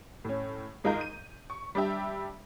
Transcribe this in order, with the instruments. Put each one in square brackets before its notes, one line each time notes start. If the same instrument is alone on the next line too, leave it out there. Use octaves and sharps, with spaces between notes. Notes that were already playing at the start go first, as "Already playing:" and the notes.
[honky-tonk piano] A2 C#4
G#2 G#3 F4 A#4 A#5 G6
D#7
C#6
G3 D4 G4 E5